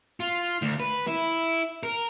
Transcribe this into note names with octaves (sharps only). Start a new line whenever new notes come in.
F4
D2
B4
E4
A#4